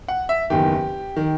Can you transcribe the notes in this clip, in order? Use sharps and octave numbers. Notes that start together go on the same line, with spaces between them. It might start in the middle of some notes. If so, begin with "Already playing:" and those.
F#5
E5
F#1 E2 D#3 G4
D#3